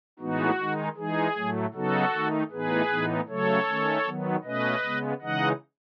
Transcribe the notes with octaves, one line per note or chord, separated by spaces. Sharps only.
A2 E3 G#3 B3 D#4 F#4
D#3 G#3 D#4
E3 G#3 D#4 G#4
A2 F#3 A3
C#3 F#3 B3 D#4 F#4 A4
D#3 A3 D#4
A2 E3 B3 D#4 G#4 B4
A2 E3 B3 D#4
C#3 F#3 A3 A4 C#5
D#3 A3 C#4
D#3 F#3 B3
B2 A3 C#4 B4 D#5
C#3 G#3 B3
C#3 E3 G#3 D#4 D#5 F#5